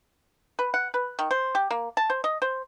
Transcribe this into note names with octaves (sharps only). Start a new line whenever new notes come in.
B4
F#5
B4
D#3
C5
G4
A#3
A5
C5
D#5
C5